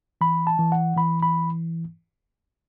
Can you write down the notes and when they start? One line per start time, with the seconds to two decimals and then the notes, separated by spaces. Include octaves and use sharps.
0.21 E3 B5
0.47 A5
0.59 E3
0.72 F#5
0.97 E3 B5
1.23 B5